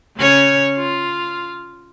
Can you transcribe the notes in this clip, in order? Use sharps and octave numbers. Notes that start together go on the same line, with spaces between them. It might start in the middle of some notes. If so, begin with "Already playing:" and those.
C#3 C#4 C#5
F4